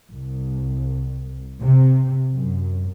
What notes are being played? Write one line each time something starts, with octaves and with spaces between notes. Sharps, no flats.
C2
C3
F#2